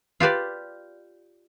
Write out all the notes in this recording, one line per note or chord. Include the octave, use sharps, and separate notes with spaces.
F4 G4 B4 D5